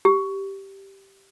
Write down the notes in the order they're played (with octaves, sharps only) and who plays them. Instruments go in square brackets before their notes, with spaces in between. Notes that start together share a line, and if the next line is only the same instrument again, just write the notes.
[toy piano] G4